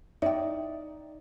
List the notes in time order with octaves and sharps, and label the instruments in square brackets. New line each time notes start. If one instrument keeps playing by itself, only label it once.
[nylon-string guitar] D#4 D5 [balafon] E5 G5